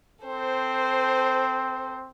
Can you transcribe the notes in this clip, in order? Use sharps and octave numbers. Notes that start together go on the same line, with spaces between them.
C4 A4 C5